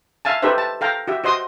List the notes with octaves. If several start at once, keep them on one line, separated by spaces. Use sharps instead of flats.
E5 F5 G#5 A5
D#4 G4 A4 B4 C5 E5
A5
A4 F5 G5 A#5
F#4 G4 E5
F#4 C5 D#5 C6 D#6